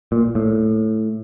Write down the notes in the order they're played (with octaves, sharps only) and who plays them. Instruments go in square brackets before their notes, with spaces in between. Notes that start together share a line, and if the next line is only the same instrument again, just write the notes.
[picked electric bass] A#2
A2